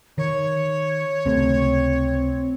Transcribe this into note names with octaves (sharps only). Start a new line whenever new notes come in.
D#3 C#5
C#2 C3 A3 C4